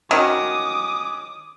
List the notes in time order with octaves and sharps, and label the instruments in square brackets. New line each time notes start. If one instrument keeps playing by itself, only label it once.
[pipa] D#3 [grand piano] C#4 F#4 [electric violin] D6 D#6